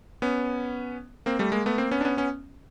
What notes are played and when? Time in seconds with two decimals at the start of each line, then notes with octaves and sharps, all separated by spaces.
0.22 B3 C#4
1.26 A#3 C4
1.39 G3 A3
1.52 G#3 A#3
1.66 A3 B3
1.78 A#3 C4
1.91 B3 C#4
2.01 D4
2.05 B3 C#4
2.17 B3 C#4